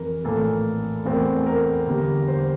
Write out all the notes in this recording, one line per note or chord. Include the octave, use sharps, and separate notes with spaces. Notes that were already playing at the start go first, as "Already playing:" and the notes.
Already playing: F1 F2 E3 A#4
A#1 A2 E3 A#3 A4
E2 E3 A3 C4 A#4
A#4
E2 D3 G3 A#3
C5